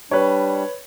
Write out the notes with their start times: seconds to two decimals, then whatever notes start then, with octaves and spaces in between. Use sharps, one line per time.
0.11 G3 D4 B4 C#5